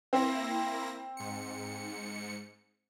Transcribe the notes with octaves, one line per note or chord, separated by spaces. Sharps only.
A#3 C4 E4 A#6
G#2 C#7